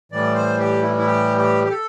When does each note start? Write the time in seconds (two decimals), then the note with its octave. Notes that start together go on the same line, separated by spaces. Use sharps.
0.12 A2 E3 G3 D5
0.35 C5
0.59 G4
0.82 E4
0.98 E4
1.06 G4
1.37 G4
1.64 G4
1.70 A4